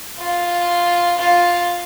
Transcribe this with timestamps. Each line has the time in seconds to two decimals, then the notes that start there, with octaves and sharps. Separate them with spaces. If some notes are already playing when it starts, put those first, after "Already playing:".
0.19 F4
1.19 F4